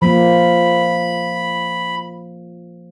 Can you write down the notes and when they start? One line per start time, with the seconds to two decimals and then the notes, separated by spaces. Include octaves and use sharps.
0.02 F3 A#3 B5